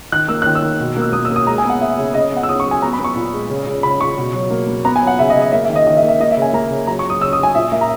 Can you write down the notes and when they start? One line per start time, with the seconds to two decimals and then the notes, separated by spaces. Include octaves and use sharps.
0.12 D#3 F#6
0.28 A#3 E6
0.42 D#3 F#6
0.55 E6
0.63 D#3
0.80 B2
0.97 A#3 E6
1.13 A#3 D#6
1.25 E6
1.30 A#3
1.36 D#6
1.47 G#3 A#5
1.58 G#5
1.64 B3
1.70 F#5
1.81 G#3 E5
1.98 C#3
2.14 C#3 D#5
2.32 B3 F#5
2.43 E6
2.49 C#3 D#6
2.60 C#6
2.65 F#3
2.71 G#5
2.82 B3 A#5
2.93 B5
2.99 B3
3.04 C#6
3.16 A#2
3.33 G#3
3.50 C#3
3.67 C#3
3.83 C#3 B5
4.00 C#3 C#6
4.18 B2
4.35 F#3
4.51 A#3
4.68 A#3
4.85 B3 A#5
4.96 G#5
5.01 F#3
5.07 F#5
5.19 C#3 E5
5.30 D#5
5.36 C#3
5.42 D#5
5.52 A#3 E5
5.64 E5
5.70 D#3
5.76 D#5
5.87 D#3 D#5
5.97 E5
6.02 A#3
6.08 E5
6.20 A#3 D#5
6.31 E5
6.37 C#3 G#5
6.53 A#3 A#5
6.70 C#3
6.87 F#3 A#5
6.99 C#6
7.05 F#3
7.10 D#6
7.21 C#3 E6
7.33 D#6
7.39 F#3 G#5
7.55 A#2 E5
7.72 A#3 E5
7.81 A#5